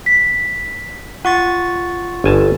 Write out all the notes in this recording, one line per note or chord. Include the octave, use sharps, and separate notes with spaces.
B6
F4 F#5 C#6 A6
G1 G#5 A5